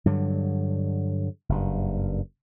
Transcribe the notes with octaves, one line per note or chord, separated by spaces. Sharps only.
G2 D3 F#3
F#1 G2